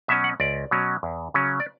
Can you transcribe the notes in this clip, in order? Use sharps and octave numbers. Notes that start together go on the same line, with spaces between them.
B2 F#3 C#4 E5
F#5
C#2 D5
B2 F#3 C#4
E2
C#3 F#3 C#4
D5